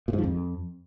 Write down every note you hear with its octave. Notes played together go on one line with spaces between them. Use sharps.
A#2
G#2
F3
F2